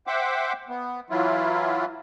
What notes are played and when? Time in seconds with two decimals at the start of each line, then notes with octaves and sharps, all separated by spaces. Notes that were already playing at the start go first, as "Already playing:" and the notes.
0.07 C5 E5 F#5 G5 D6
0.69 B3
1.10 E3 F#3 E4 F4